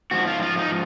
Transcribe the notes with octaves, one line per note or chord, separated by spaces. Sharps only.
G#2 F3 F#4
F4
F4
D#4